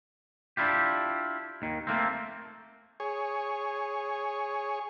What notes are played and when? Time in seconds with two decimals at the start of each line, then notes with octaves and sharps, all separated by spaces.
0.57 D4 E4 F4 G4
1.62 D#2 D#3
1.87 A3 A#3 C4
3.00 G#4 C#5